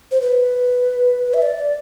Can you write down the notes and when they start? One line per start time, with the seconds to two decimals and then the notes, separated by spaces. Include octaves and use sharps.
0.11 C5
0.21 B4
1.34 E5
1.42 D5